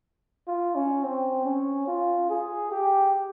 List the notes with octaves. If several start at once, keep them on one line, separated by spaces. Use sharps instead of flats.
F4
C#4
C4
C#4
F4
G#4
G4